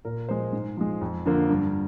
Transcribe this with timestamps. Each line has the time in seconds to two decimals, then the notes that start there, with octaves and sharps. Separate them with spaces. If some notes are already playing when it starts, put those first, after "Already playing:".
0.05 A#2 A#4
0.29 F3 G#3 C5
0.53 G#2
0.77 F3 G#3
1.01 F2
1.26 D3 F3 A#3
1.49 G2